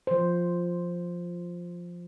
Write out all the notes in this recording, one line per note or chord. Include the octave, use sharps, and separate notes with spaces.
F3 C5